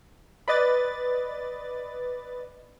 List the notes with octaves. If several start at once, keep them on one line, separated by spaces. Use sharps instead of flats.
B4 D5 D#5 A6